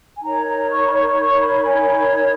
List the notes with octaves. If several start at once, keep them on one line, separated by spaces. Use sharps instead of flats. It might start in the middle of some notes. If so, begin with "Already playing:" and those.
G#5
D#4 A#4 C#5 A#5
A#5
C#6
B5
C#6
C#6
B5
G#5
B5